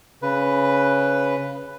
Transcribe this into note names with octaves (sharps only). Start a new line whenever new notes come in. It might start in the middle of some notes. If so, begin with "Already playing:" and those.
C#3 B4